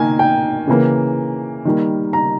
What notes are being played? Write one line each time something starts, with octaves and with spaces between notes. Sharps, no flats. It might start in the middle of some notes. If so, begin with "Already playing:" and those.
Already playing: D#3 A#3 G#5
G5
C#3 E3 A#3
D#3 G3 A#3
A#5